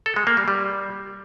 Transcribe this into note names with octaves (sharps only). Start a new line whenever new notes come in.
A4
G#3
A#3
G3
G3